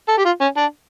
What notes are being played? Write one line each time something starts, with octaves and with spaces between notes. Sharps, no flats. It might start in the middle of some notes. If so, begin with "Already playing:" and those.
A4
G4
F4
C#4
D4